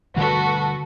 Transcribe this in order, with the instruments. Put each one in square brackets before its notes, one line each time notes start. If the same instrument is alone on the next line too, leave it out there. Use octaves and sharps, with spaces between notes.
[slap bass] D3 G3 A3 [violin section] F#4 A4 B4